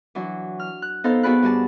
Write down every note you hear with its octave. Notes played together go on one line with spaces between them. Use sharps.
E3 F#3 D4
F6
F#6
B3 D#4 A4 C5 F5
B3 F#4 G#4 D5 B5 F#6
G2 F#4 G#4 A5